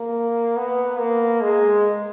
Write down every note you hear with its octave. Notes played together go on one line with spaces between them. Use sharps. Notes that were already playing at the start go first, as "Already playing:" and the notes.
Already playing: A#3
B3
A#3
G#3